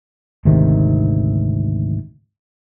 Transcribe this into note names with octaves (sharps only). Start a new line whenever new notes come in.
G#1 D2 C3 D#3